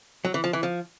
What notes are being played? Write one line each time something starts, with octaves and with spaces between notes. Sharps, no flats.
F#3
E3
F3
E3
F3